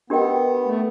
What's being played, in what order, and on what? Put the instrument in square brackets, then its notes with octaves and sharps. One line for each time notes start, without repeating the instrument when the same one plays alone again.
[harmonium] B3 [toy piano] D4 G4 A#4 D#5 G5
[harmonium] A3